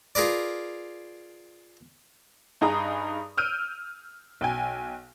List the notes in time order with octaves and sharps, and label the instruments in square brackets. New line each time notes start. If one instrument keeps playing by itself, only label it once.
[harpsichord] F4 G#4 A#4 B4 D5
[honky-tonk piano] G2 D#4 G#4 A#5 D#6
E6 F6 G6 D7 D#7
B1 G5 G#5